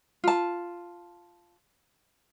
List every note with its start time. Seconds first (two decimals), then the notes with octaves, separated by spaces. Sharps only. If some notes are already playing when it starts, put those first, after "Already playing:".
0.24 F4 A5